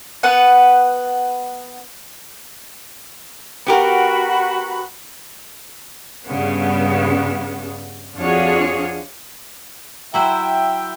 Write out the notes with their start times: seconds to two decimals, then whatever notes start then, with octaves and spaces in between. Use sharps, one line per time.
0.23 B3 B4 F#5
3.67 B3 F#4 G4 A#4 B5
6.27 G2 C#3 B3
8.17 F2 D4 F4 F#4 G#4 C#5
10.14 F#3 E4 C5 E5 G5